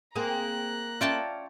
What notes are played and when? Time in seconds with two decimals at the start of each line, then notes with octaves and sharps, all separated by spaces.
0.15 A#3 C4 G#4 A#5 F#6
1.01 C#4 F4 D5 E5 G5 A5